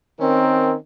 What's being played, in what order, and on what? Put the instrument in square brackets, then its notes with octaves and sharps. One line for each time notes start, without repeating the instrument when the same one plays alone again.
[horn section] D#3 C#4 A#4 [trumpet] C4